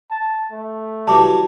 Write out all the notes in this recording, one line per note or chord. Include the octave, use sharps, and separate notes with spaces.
A5
A3
E3 F#3 G3 A5 D6